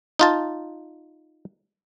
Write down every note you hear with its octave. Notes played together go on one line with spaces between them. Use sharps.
D#4 F4 A5